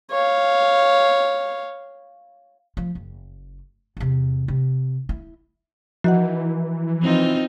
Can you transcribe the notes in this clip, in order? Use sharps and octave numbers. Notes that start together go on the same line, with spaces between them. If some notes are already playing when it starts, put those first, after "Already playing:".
C#5 F5
F3
F#1
E2 C3
C3
E4
E3 F3 F#4 D#5 F#5
C4 D#4 F4